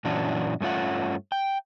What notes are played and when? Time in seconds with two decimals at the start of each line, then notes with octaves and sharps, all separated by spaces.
0.04 F#2 A#2 E3 C#4 D4 F#4
0.60 G2 A3 C#4 F4 F#5
1.32 G5